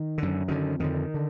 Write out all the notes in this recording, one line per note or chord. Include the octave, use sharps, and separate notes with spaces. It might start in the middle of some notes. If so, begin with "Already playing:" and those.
Already playing: D#3
F#2 D3
F#2 D3 D#3
F2 D3 D#3
D3